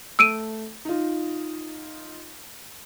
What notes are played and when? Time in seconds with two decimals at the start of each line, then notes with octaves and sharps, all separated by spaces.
0.19 A3 E6 D7 D#7
0.85 D#4 F4